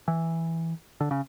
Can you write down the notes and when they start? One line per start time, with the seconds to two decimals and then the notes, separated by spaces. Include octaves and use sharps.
0.08 E3
1.01 D3
1.11 C#3